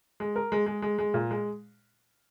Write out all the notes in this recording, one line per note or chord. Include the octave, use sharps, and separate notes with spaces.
G#3
A#4
G#3
G#3
G#3
G#3
A#2
G#3